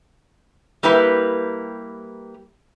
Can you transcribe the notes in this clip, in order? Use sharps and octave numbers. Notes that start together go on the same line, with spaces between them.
G3 A#3 E4 G4 B4